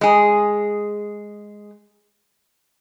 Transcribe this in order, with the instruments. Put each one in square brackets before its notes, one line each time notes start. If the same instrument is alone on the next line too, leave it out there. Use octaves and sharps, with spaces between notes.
[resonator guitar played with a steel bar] G#3 G#4